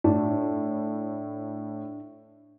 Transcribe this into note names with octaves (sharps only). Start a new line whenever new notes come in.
A2 D4